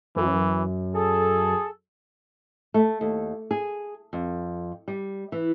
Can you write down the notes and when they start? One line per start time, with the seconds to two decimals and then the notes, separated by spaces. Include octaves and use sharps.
0.16 F#2 E3
0.95 G#4 A4
2.74 A3
3.01 D#2
3.51 G#4
4.13 F2
4.88 G3
5.32 E3